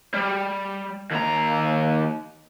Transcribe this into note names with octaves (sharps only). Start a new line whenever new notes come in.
G3
D#2 A#5